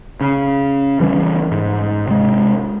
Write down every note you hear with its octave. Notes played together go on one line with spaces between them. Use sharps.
C#3
C#3 E3 G3 C#4
G#2
C3 G#3